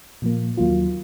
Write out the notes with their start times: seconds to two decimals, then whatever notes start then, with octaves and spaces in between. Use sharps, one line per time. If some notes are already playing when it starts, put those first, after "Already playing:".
0.22 A#2 F3 A#3
0.57 D#2 D#3 F#3 A#3 F4